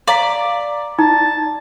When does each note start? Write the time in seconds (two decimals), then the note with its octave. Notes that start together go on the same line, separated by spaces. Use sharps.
0.08 D5 F5 A#5 B6
0.99 D#4 A5 A#5